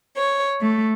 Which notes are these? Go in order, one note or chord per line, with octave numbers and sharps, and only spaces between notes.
C#5
A3